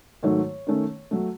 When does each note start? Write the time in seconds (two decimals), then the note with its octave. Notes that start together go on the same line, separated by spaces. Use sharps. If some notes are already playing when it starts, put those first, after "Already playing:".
0.23 G#2 D#3 F#3 A3 C#5
0.67 D#3 A3 C#4
1.11 F#3 A3